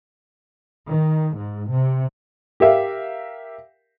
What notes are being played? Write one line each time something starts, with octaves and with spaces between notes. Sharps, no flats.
D#3
G#2
C3
G4 A#4 E5 F5